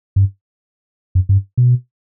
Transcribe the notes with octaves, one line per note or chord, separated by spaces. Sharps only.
G2
F#2
G2
B2